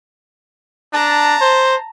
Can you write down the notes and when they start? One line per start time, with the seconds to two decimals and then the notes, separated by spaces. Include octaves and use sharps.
0.93 D4 A5 A#5
1.41 C5